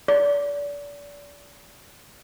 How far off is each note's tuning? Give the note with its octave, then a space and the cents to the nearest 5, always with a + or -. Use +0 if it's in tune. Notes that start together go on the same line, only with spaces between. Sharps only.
D5 -30